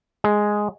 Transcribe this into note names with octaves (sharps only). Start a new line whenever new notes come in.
G#3